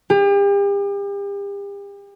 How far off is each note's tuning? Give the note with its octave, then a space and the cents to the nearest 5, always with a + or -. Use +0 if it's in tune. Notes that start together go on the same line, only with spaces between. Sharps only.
G4 +40